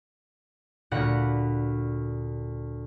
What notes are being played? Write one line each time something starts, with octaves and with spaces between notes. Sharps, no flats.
D2 A#2 F#5 B5 F#6 A#6